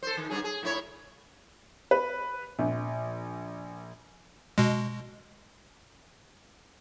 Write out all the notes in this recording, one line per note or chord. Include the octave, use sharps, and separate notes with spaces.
A4 C5
D#3
G2 C#4 G#4
G#4
A2 E4 C#5
B4
A#1
B2 G#3